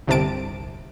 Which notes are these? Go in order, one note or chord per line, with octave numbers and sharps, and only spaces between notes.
G1 C2 C3 A5 D7